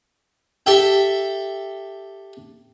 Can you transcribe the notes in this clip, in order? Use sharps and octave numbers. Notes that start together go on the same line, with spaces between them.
G4 A4 E5 G5